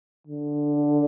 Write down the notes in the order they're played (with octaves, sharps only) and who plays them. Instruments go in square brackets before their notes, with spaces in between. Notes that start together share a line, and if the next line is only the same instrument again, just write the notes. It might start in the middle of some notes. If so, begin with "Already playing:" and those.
[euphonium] D3